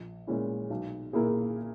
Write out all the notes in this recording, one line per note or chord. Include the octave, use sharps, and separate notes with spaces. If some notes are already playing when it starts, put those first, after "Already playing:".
Already playing: A#1
A#2 G#3 C#4 E4
B1
A#2 A#3 E4 G#4